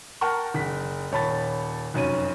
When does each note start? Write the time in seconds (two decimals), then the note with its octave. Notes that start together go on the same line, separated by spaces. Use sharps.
0.21 A#4 F#5 G5 A5 A#5 C#6
0.54 F#1 B6
1.12 D#1 C#5 A5 B5 A6
1.94 F1 F#2 C#4 D#7